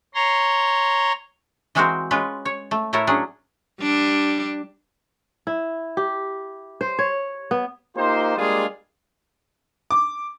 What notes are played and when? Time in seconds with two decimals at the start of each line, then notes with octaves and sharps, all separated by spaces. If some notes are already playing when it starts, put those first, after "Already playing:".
0.14 C#5 A#5 C6
1.75 E3 G#3 C4 F#4 A#4 C5
2.11 G#3 C#4 F4 B4
2.45 C#5
2.71 A3
2.93 A2 A3 E4 A#4 C#5 A5
3.07 F#3 C#4 D4 G#4
3.81 G3 D4
5.47 E4
5.97 G4
6.81 C5
6.99 C#5
7.51 B3
7.97 A#3 D#4 F4 G4 C5
8.38 G3 G#3 A#3 D4 F4 G#4
9.91 D6